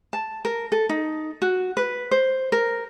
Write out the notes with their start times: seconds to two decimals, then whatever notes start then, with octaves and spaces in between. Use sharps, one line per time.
0.13 A5
0.45 A#4
0.72 A4
0.89 D#4
1.42 F#4
1.77 B4
2.11 C5
2.52 A#4